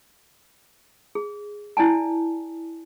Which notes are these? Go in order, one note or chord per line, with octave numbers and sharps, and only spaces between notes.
G#4
E4 D5 G#5 A5